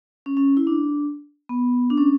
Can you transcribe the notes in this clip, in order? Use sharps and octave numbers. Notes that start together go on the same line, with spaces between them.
C#4
C#4
E4
D4
B3
D4
C#4